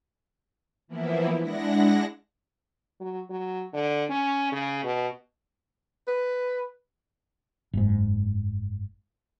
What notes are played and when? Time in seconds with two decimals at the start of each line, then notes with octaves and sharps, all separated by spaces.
0.88 E3 F3 A#3 B3 E4
1.40 G#3 D4 E4 F#5 A#6
3.00 F#3
3.30 F#3
3.73 D3
4.10 C#4
4.52 C#3
4.84 B2
6.08 B4
7.73 F#1 G#2